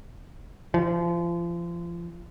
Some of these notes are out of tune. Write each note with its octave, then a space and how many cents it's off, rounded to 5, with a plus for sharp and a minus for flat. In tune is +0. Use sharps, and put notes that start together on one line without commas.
F3 -30